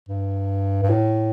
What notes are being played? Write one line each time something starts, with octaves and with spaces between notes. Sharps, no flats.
G2
G2
A2